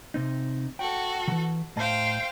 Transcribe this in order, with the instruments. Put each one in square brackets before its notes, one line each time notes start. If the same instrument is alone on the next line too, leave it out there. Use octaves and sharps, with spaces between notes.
[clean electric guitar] C3 C4 D#4
[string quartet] F#4 A4 [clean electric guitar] G5
[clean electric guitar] D#3 E3
[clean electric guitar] A2 D#5 A5 [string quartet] C5 F5 G5